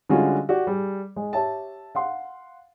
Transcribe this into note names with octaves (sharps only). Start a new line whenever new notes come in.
D3 G3 G#3 C#4 F4 F#4
F#4 G4 D5
G3 G#4
G#3
G4 C#5 E5 A5
F5 F#5 C6